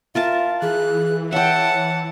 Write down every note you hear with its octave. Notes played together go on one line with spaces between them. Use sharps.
F4 A#4 E5 A5
E3 G#4 F#6
C#5 E5 F#5 G5 A5